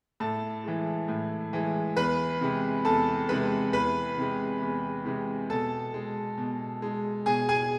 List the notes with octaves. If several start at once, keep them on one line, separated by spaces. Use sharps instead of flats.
A2 A4 A5
E3 G#3
A2
E3 G#3
E2 B4 B5
C3 G#3
E2 A4 A5
C3 G#3 B4 B5
E2 B4 B5
C3 G#3
E2
C3 G#3
B2 A4 A5
G#3
B2
G#3
B2 G#4 G#5
G#4 G#5